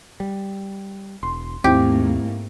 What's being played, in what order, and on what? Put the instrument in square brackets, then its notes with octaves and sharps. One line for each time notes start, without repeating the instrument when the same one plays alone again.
[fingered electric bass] G3
[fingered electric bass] E1 [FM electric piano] C6
[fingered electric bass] D#2 [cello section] G#2 A3 A#3 [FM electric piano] C4 E4 [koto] G4